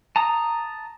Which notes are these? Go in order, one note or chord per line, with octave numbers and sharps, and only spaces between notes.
A5 A#5 D#6